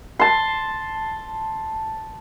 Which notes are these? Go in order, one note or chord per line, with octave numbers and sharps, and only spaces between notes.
A5 C6